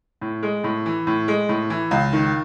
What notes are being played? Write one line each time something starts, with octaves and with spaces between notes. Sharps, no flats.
A2
G#3
A2
E3
A2
G#3
A2
E3
C#2
D#3